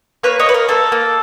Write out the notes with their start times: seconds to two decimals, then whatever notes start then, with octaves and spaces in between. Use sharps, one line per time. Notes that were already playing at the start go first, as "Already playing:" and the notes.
0.23 A#3 B4 C#5
0.40 C#5 D#5
0.46 A#3 B4
0.54 A#4
0.69 A#3 A4
0.92 A#3